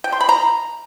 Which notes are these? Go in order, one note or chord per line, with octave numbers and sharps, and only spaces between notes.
G5
C6
B5
A#5